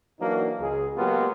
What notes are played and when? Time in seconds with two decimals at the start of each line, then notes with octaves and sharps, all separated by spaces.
0.20 E3 F#3 A#3 D4 D#4 F#4
0.60 C#2 G#4
0.96 F#3 G#3 A#3 B3 F4 G4